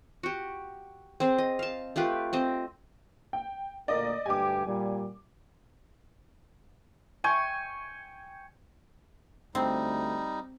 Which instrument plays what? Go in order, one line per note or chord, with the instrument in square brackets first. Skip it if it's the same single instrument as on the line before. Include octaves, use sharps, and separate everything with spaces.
[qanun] F#4 G4
C4 G#4 C5
D#5
F5 A5
A3 F4 G4 B4
C4 C5 D#5
[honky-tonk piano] G5
[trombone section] D2 A#2 A#3 [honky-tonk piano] D5 D#5
[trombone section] D2 G2 G4 [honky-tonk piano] G#5 D6
[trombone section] A#2 G3
[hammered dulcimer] G5 G#5 C#6
[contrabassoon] D2 [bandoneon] G3 D#4 [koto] C4